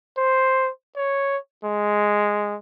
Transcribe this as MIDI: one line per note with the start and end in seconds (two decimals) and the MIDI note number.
0.17 0.70 72
0.96 1.37 73
1.64 2.56 56